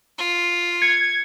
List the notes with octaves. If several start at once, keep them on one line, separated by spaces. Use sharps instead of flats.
F4
G#6 C#7